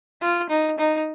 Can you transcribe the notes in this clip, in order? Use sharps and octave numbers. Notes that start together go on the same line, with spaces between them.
F4
D#4
D#4